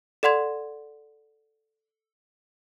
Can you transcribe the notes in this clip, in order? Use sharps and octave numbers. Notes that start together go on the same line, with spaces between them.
A4 D5 F#5 C6 G#6